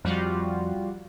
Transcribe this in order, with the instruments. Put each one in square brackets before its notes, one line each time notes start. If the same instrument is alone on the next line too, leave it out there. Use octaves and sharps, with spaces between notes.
[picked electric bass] F2 [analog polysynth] G3 F4 F#4